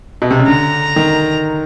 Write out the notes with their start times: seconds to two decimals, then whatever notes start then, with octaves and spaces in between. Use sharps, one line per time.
0.22 B2
0.31 C3
0.39 C#3
0.47 D3 A#5
0.96 D#3